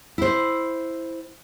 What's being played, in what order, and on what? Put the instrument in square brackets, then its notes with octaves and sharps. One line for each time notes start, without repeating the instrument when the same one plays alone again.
[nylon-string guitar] E4 C5